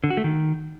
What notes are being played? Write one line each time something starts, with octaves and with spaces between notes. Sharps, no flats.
D3
F#4
A3
D#3